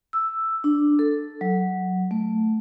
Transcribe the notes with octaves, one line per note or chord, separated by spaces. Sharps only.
E6
D4
A4
F#3
A3